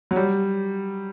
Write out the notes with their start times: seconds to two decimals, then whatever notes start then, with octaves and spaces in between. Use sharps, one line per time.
0.11 F#3
0.16 G3